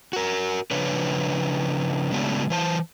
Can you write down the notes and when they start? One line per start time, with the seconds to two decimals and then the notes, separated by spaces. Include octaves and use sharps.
0.13 F#4 A#4
0.71 C#3 F3 D4 B4 C#5
2.12 C#3 F#3 G#3 A3 B3 D4
2.50 E3 C5 A5